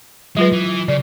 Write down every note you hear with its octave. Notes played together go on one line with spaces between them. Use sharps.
F#3 G#3 F4 B4
E3
C#3 D5